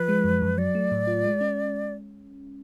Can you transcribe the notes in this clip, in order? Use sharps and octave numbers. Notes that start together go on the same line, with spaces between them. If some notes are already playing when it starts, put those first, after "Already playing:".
Already playing: F3 B4
G#3
F#2
F#2
F#3 D5
A3
A2
F4
G#3
C#4